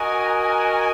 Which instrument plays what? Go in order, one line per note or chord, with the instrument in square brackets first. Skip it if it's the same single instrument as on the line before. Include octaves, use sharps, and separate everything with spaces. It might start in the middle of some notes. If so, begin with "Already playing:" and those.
Already playing: [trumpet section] F#4 A#4 D#5 [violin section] G#5
[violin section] G#5